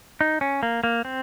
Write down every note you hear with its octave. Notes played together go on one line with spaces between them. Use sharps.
D#4
C#4
A#3
A#3
C4